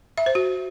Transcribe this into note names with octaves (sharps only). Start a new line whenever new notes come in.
E5
C5
F#4